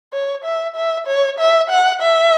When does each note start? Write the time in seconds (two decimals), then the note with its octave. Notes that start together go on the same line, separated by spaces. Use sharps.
0.13 C#5
0.44 E5
0.76 E5
1.07 C#5
1.39 E5
1.70 F#5
2.02 E5